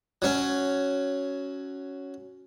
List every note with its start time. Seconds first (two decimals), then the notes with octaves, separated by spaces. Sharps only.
0.22 F#3 C#4